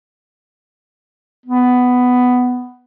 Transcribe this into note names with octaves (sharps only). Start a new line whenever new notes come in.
B3